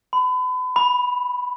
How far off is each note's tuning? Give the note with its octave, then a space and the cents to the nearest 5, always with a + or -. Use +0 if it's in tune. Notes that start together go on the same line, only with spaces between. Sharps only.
B5 +35
B5 -5